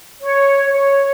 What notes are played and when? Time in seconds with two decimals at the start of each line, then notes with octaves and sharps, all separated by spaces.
0.22 C#5
0.72 C#5